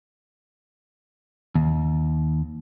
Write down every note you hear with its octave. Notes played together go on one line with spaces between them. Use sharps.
D#2